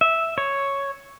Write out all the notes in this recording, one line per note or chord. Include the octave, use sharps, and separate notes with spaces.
E5
C#5